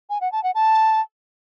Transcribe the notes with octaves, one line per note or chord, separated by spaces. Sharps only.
G#5
F#5
A5
F#5
A5